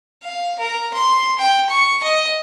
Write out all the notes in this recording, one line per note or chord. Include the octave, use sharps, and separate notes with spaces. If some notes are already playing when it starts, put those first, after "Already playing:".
F5
A#4
C6
G5
C#6
D#5